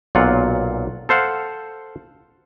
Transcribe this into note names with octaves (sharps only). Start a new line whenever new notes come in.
B1 A#2 F#3 F4 F#5
A4 C5 F5 F#5